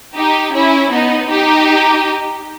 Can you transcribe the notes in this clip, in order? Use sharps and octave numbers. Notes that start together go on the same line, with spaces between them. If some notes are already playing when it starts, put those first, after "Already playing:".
D#4 G4
C#4 E4
B3 D#4
D#4 G4